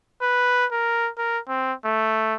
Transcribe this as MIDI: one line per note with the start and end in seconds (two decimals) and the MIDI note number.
0.22 0.66 71
0.72 1.10 70
1.18 1.39 70
1.49 1.73 60
1.85 2.35 57